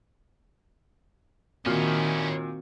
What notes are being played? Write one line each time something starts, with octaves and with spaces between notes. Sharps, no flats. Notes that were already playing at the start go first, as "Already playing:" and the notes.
A#2 D#3 C4 C#4 E4 F#4 F6 C7